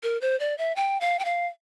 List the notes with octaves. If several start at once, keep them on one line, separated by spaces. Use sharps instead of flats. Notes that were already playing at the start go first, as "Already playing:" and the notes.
A#4
C5
D5
E5
G5
F5
G5
F5